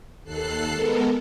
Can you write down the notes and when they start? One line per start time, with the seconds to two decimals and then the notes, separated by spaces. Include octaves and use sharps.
0.24 D#2 A4 F#6 C7
0.73 G#3 B3 A4 A#4